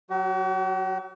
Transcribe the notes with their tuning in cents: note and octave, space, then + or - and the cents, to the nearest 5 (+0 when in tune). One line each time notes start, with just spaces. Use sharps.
F#3 +0 F#4 +45